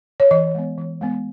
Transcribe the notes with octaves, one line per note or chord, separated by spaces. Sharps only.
C#5
E3 D#5
G#3 B3
E3
G#3 B3